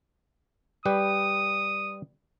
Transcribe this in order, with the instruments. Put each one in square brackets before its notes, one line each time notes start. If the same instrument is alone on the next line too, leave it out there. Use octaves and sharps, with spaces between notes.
[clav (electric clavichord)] G3 G4 B4 [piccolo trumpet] D#6